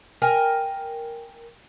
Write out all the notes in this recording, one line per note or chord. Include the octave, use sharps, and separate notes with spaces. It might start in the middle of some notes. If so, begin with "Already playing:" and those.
A#4 G5 G#5